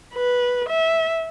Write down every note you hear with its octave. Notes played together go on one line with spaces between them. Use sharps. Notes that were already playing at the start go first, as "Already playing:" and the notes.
B4
E5